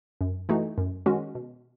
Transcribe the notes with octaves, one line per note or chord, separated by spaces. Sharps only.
F#2
E3 A3 D#4 F#4
F#2
D#3 G#3 C#4 F#4
B2